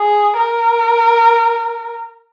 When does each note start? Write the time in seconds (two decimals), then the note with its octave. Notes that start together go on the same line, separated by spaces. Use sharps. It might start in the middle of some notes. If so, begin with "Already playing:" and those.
Already playing: G#4
0.37 A#4